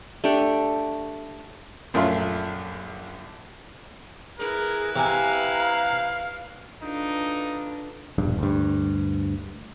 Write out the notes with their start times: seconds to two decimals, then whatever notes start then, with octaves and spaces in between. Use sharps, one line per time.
0.24 A3 D4 G4
1.94 A#1 F#2 A3 F4 C6
4.39 E4 G#4 A#4 B4
4.96 C3 F5 G#5 A#5
6.82 D4 D#4 F4 A4 B4
8.18 E1 A#1 G2
8.39 D2 G2